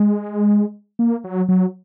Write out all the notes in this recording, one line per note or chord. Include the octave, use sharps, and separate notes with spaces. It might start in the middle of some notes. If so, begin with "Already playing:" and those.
Already playing: G#3
A#3
F#3
F#3